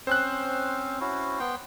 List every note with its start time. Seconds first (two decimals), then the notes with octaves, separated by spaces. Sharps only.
0.07 C4 C#4 C5 F#6
1.00 C#4 E4 F#4
1.40 B3 G5 C6